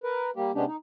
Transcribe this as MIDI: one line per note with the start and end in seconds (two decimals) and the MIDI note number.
0.04 0.30 70
0.04 0.30 71
0.36 0.52 55
0.36 0.52 58
0.36 0.52 67
0.55 0.65 48
0.55 0.65 56
0.55 0.65 59
0.55 0.65 61
0.55 0.65 62
0.55 0.65 67
0.67 0.76 63